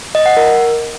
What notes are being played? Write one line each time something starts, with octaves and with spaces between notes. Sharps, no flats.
D#5
F#5
A#4